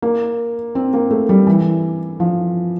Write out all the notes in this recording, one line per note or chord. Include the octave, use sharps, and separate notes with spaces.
A#3
C4
A#3
A3
G3
E3
F3